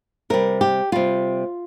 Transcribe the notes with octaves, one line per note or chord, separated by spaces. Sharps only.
C3 G3 A#4
G4
C3 G3 F4